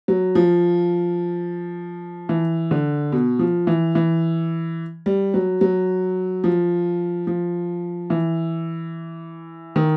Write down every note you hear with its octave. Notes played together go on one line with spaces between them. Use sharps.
F#3
F3
E3
D3
B2
F3
E3
E3
G3
F#3
F#3
F3
F3
E3
D#3